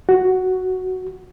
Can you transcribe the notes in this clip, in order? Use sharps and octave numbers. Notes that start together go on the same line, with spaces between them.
F#4